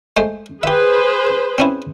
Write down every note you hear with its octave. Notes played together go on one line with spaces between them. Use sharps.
G#3 A3 C5
G4 G#4 B4 C5 E5
C4 C#4 E4